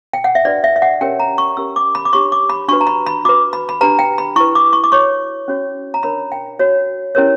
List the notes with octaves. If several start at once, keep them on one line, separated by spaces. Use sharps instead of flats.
G5
F#5
E5
D4 F#4 B4 D5
E5
E5
F#5
C#4 G4 A#4 C#5 G5
A#5
C#6
C#4 G4 A#4 E6
D6
B5
D6
D4 G4 C#5 C#6
D6
B5
D4 F#4 B4 C#6
A#5
B5
B5
F#4 B4 D6
B5
B5
D4 G4 B4 A#5
G5
B5
E4 B4 C#6
D6
C#6
D6
F#4 C#5 C#6
C#4 F#4 C#5
A#5
D4 A#4 C#5 B5
G5
F#4 C#5
C#4 E4 G4 A#4 C#5